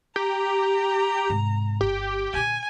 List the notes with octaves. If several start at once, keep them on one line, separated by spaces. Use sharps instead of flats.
G4 A#5
G#2 C3
G1 G4
A#2 D3 G#5